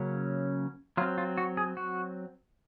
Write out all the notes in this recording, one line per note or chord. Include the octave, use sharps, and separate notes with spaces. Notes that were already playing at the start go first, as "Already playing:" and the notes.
Already playing: C#3 F#3 A#3 C#4
F#3 C4 F4
F4
F#4
G#4
F#4